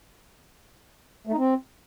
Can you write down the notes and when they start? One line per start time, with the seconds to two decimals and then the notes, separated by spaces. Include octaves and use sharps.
1.27 A3
1.32 D#4
1.38 C4